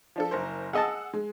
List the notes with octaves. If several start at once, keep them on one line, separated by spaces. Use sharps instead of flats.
F3 D4 A4
F#1 A#4 C5
G#4 D#5 F#5 A5 E6
G#3